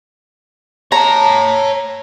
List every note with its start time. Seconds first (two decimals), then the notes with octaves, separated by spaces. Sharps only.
0.92 C#5 A5 A#5